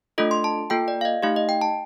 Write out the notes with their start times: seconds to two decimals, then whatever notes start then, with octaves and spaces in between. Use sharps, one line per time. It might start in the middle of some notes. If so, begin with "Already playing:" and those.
0.18 A3 D4 F4 A4 D#5
0.31 C6
0.44 A5
0.70 A#3 F4 A4 G5
0.88 D5
1.01 F5
1.05 D#5
1.23 A3 D#4 G4 F5
1.36 D#5
1.49 G5
1.61 A5